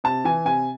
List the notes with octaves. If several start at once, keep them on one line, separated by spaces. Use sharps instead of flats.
C3 A5
E3 G#5
C3 G#5